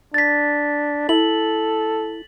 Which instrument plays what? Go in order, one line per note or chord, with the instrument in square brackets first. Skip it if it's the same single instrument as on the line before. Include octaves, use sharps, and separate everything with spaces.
[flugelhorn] D4 [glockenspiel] A6 B6
[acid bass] E4 [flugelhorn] A4 [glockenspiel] F#7